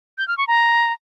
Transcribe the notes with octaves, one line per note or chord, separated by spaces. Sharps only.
G6
F6
C#6
A#5